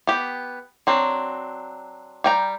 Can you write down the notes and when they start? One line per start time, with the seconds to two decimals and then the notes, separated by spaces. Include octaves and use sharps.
0.07 B3 G4
0.87 F#3 C4 D4
2.24 G3 G5 A#5